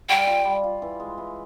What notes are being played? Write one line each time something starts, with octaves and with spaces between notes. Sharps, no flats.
G3 G5
F4
G3
F4
E3
G#3
E3